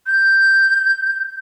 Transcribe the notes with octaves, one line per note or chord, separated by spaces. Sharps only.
G6